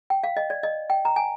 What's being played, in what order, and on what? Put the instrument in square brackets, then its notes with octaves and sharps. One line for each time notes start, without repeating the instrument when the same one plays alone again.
[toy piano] G5
F5
D#5
D5
D#5
G5
A#5
G#5